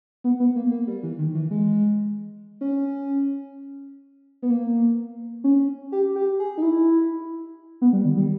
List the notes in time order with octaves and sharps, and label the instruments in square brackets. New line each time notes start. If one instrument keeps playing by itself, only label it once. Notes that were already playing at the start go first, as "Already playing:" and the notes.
[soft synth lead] B3
B3
A#3
A#3
G3
E3
D#3
E3
G#3
C#4
B3
A#3
C#4
G4
G4
G#4
D#4
E4
B3
G3
D#3
G3